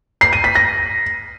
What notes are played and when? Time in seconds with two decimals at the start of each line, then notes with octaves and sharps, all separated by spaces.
0.21 C7
0.33 D#7
0.44 B6
0.55 A#6